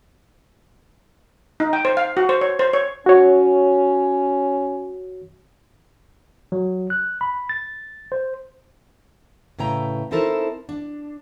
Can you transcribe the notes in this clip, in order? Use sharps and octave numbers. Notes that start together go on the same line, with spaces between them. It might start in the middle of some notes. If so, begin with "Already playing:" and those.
D#4
G5
C5
F5
F#4
C5
C#5
C5
C#5
C#4 F#4 C#5
F#3
F#6
B5
A6
C5
A2 C#3 E4 B4 G5 A#5
C4 D#4 E4 A4 A#4 C5
D4